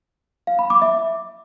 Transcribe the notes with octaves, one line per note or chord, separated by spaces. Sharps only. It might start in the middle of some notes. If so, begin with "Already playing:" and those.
F5
B5
D6
E5